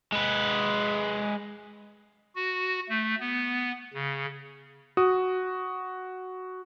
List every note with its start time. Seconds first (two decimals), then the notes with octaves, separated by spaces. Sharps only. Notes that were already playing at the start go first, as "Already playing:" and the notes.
0.12 G#3 B4
2.35 F#4
2.89 A3
3.20 B3
3.94 C#3
4.97 F#4 D#6